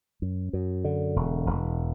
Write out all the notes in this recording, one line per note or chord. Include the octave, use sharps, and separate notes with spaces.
F#2
F#2
D3
E1
E1